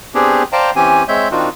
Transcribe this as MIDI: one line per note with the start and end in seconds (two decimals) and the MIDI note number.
0.15 0.43 59
0.15 0.43 60
0.15 0.43 62
0.15 0.43 67
0.15 0.43 68
0.53 0.71 72
0.53 0.71 74
0.53 0.71 77
0.53 0.71 79
0.53 0.71 81
0.53 0.71 82
0.76 1.03 52
0.76 1.03 60
0.76 1.03 61
0.76 1.03 67
0.76 1.03 80
1.08 1.28 56
1.08 1.28 60
1.08 1.28 73
1.08 1.28 76
1.08 1.28 91
1.31 1.49 51
1.31 1.49 60
1.31 1.49 62
1.31 1.49 63
1.31 1.49 65
1.31 1.49 66